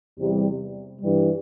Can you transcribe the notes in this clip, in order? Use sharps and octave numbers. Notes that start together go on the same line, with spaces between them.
E2 C3 G3
G2 E3 G3